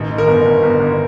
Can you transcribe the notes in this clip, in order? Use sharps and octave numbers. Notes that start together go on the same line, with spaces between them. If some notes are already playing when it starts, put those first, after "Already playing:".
Already playing: A1 D#3
D#3
A#4
G1
G1
G1
G1